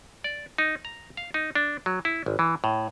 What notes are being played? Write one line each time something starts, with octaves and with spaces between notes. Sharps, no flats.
D5
D#4
A#5
F5
D#4
D4
F#3
E4
G#1
E3
A2